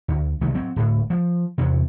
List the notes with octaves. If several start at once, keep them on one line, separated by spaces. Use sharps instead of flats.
D2
C2 D#3 A3
F#3 C4
D1 A2
F3
E2 G2 C3